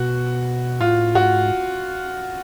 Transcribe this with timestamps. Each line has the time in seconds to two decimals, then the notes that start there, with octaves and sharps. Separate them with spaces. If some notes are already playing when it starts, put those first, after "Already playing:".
Already playing: B2 F#4
0.80 A2 F4
1.15 G#2 F#4